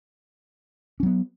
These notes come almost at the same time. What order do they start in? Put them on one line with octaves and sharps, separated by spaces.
C#4 F#3 B3